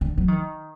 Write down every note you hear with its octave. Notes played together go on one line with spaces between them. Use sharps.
D3
F#3
D#3